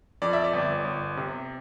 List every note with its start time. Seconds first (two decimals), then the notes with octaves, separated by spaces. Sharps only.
0.22 F2 D5
0.33 E5
0.44 D5
0.53 G1
0.85 G1
1.17 C3